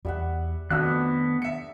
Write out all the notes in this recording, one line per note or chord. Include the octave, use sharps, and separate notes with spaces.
E2 G3 E5 F#5
F2 D#3 A3 B3 D4 F#4 E6 F#6
E5 C#7